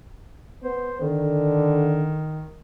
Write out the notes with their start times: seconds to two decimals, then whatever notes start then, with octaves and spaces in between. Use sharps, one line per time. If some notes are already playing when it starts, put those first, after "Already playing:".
0.64 B3 C5
1.00 D3 D#3